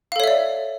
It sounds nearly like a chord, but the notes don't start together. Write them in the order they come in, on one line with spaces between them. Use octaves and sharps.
F5 A4 C#5 E5 D5